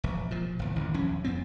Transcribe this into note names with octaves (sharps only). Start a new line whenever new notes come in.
E1 A#1
A#2 F3
G1 E2
A1 D#3
D#1 C2 F3 C#4
F2 B3 C4